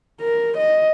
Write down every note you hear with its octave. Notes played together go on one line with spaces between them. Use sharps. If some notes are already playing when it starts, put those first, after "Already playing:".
A#4
D#5